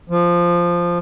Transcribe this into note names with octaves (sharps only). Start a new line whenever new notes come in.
F3